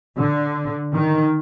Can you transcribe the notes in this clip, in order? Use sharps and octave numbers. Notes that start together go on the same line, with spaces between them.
D3
D#3